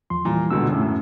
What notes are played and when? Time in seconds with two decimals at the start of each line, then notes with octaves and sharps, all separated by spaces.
0.10 E2 F3 C6
0.25 A#2 E3 G3 A#5
0.50 C#2 B2 D3 E6
0.69 F#2 A2 C#4